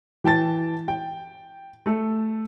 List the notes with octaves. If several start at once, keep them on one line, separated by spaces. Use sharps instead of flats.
E3 G5 A5 A6
G5
A3 A4